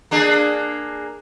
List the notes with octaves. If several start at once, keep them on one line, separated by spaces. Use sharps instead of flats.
A#3 D4 G#4